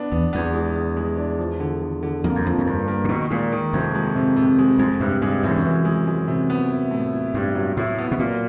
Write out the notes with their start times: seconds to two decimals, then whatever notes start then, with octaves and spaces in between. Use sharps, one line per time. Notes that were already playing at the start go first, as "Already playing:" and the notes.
Already playing: B3 D4
0.12 E2 B3
0.33 E2 B3
0.54 G#3
0.75 B3
0.97 G#3
1.17 D4
1.39 F3
1.60 D3
1.82 D3
2.03 D3
2.24 F2 A#3
2.35 F#2
2.45 F2 F3
2.58 F#2
2.66 G2 A#3
2.88 A#3
3.04 A#2
3.09 B2 D#3
3.30 A#2 G#3
3.52 D#3
3.73 F2 C3
3.95 G#3
4.15 C3
4.36 C3
4.59 G#3
4.79 F2 G#3
5.00 G2 C3
5.21 G2 G#3
5.43 F#2 E3
5.51 G2
5.57 F#2
5.65 E3
5.85 G#3
6.07 G#3
6.28 C3
6.50 B3
6.70 E4
6.91 A2
7.13 E4
7.34 G2 E4
7.55 F#3
7.77 A2 E4
7.98 B3
8.11 B2
8.19 A#2 F#3